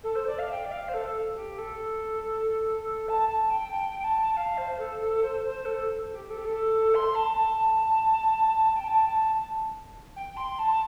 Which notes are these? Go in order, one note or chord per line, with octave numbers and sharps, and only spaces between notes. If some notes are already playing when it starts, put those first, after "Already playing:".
A4
C5
D5
F5
G5
D5
F5
C5
A4
G4
A4
A5
A5
G5
G5
A5
F5
C5
A4
A4
C5
C5
A4
G4
A4
G4
A4
C6
A5
A5
G5
A5
A5
G5
C6
A5